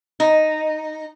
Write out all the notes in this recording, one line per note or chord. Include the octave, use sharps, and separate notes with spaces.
D#4